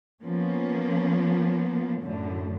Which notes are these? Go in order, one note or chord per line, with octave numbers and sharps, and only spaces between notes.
F3 A#3 B3 C#4
F#2 A2 D3